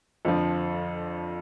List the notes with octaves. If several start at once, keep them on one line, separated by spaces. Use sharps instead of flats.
F2 D3 F3